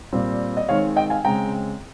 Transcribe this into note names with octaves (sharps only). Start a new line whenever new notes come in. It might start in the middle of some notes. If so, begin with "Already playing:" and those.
A#2 G3 C4
D#5
D#3 G#3 C4 C#5 F5
D#5 G5
F5 G#5
C#3 G#3 C4 G5 A#5